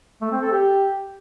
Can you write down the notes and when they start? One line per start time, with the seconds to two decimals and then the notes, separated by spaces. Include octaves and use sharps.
0.22 A3
0.32 C4
0.42 A4
0.52 G4